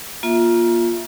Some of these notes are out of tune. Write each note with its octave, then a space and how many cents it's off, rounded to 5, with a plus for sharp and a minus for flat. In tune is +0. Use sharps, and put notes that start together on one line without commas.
A#3 +25 F4 +0 E5 +0